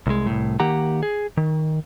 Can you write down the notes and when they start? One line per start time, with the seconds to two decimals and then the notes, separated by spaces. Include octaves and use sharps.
0.07 C2 G#3
0.27 C2 A2
0.60 D#3 A#3 G4 F#5 A#5
1.03 G#4
1.37 D#3